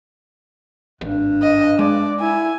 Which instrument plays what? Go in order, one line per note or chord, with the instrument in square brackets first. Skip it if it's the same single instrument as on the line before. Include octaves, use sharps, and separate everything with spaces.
[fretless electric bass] G#1 [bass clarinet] G2
[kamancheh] D#5
[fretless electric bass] G#3 [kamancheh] D5
[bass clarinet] E4 [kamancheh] G#5